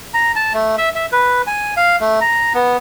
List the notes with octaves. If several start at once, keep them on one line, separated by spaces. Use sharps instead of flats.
A#5
A5
A3
E5
E5
B4
G#5
F5
A3
A#5
B3